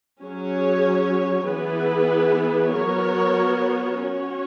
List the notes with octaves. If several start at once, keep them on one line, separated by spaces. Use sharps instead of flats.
F#3 C#4 G#4 C#5
E3 B3 E4 G#4 B4
F#3 B3 F#4 A#4 C#5
C#4 F#4 C#5